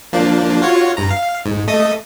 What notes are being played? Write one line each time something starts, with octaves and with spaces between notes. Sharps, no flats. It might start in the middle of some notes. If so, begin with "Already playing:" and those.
F3 A#3 D4
F4 F#4 C#5
G2 A#5
F5
G#2
A3 D#5 D#6